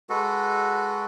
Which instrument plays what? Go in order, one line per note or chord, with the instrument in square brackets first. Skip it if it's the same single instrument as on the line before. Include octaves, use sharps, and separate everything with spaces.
[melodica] G#3 F#4 A4 B4